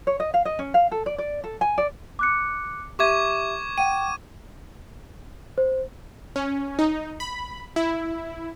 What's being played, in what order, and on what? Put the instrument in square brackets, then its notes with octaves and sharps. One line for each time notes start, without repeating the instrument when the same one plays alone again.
[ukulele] C#5
D#5
F5
D#5
C#4
F5
A4
D5
D5
A4
G#5
D5
[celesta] D6 F#6 C#7
[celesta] G4 E5 D#7 [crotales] C#6 D6 G#6
[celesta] F#5 G5 [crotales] D#7
[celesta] C5
[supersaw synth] C#4
D#4
B5
E4